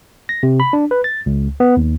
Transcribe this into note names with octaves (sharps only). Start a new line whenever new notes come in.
A#6
C3
B5
D4
B4
A6
C#2
B3
D#2